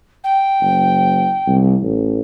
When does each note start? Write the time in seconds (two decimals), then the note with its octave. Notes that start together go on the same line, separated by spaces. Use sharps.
0.24 G5
0.61 F#1
1.47 C2
1.82 A1